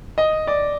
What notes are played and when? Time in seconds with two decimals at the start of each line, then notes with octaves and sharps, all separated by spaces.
0.18 D#5
0.47 D5